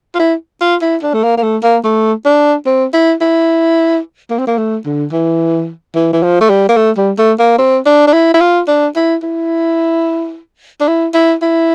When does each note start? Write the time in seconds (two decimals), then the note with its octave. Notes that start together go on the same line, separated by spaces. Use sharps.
0.15 F4
0.20 E4
0.61 F4
0.82 E4
1.03 D4
1.14 A3
1.24 A#3
1.38 A#3
1.43 A3
1.63 A#3
1.84 A3
2.26 D4
2.66 C4
2.94 E4
3.21 E4
4.31 A#3
4.39 C4
4.47 A#3
4.58 A3
4.86 D3
5.12 E3
5.95 E3
6.13 E3
6.23 F3
6.41 A3
6.50 G3
6.69 A#3
6.77 A3
6.98 G3
7.18 A3
7.39 A#3
7.59 C4
7.86 D4
8.07 D4
8.13 E4
8.34 E4
8.41 F4
8.68 D4
8.96 E4
9.23 E4
10.81 D4
10.88 E4
11.14 E4
11.43 E4